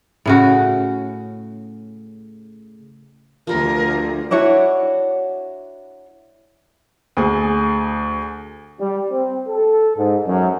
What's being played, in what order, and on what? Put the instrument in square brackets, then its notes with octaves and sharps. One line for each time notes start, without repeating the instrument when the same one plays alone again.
[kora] A2 C#3 F#4
[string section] D2 [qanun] F3 G3 [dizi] A#4
[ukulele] D4 E4 F#4 C#5
[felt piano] D2 G#4
[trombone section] G3
C4
A4
G#2
F#2